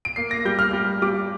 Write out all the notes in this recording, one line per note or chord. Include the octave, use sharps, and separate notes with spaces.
D7
A#3 C7
A#6
G3 G6
F6
G3
G3 D6